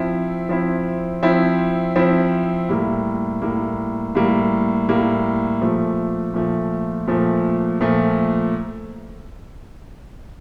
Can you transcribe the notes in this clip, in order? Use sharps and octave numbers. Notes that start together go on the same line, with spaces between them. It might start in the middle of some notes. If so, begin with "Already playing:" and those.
Already playing: F3 C4 E4
F3 C4 E4
F3 C4 E4
F3 C4 E4
A2 G3 A#3
A2 G3 A#3
A2 G3 A#3
A2 G3 A#3
A#2 F3 A3
A#2 F3 A3
A#2 F3 A3
A#2 F3 A3